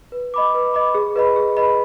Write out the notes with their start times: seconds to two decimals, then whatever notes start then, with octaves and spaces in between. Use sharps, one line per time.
0.12 B4
0.34 D#5 B5 D6
0.54 B4
0.74 D#5 B5 D6
0.95 G#4
1.16 B4 D#5 B5
1.36 G#4
1.57 B4 D#5 B5